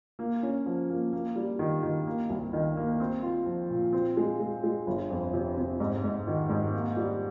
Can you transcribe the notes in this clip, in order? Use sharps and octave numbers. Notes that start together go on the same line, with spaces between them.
A#3
C#4
F3
A#3
A#3
G3
D#3
D#3
A#3
C2
D#3
A#3
C4
F4
F3
A#2
C4
G#3
G#3
G#3
G1
F2
C3
C3
G#2
G#2
D#3
G#2
A#3
G3